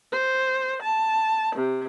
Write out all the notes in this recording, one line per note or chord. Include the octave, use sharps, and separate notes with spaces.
C5
A5
C3